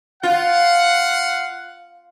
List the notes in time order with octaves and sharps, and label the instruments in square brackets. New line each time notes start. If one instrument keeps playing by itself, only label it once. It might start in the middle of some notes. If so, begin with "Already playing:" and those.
[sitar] F4 [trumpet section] F5 F#5